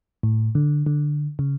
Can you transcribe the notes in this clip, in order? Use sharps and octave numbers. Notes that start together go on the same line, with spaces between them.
A2
D3
D3
C#3